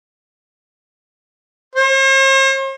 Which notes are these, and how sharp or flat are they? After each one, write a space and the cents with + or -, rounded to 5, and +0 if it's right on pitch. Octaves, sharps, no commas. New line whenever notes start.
C5 +45